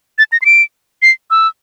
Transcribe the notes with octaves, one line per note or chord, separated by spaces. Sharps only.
A6
A#6
C7
D7
C7
E6